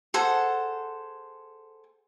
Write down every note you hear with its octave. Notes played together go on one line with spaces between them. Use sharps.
G#4 A4 C5 F#5